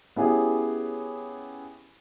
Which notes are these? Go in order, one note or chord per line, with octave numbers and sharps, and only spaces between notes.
B3 C#4 E4 G4 G#4